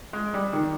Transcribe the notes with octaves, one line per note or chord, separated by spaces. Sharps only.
G#3
G3
D#3